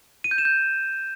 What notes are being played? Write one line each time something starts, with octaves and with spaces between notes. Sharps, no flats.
D#7
G6
E7
G6